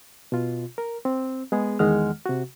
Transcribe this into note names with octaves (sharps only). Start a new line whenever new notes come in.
B2 F4
A#4
C4
G#3 B3 G#4
E2 D#3 G#3 F#5 F6
C3 F#4